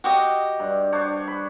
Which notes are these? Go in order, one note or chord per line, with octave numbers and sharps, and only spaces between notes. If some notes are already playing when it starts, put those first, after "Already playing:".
F#4 G4 D#5
G2
D4 C5 C#5
B5